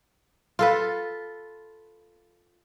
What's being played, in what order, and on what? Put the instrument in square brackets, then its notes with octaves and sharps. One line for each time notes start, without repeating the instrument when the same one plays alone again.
[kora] F4 A4 B4